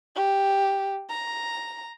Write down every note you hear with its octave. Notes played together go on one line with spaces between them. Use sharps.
G4
A#5